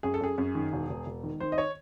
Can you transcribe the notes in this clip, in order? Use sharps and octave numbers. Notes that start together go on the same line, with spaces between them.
F#2 G#4
A4
F#2 G#4
F#2
D#3
E1
E1
E1
D#3
D#3 C5
D#5
C#5